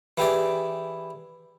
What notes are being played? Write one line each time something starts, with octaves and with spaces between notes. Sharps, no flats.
E3 E4 G4 G#4 D5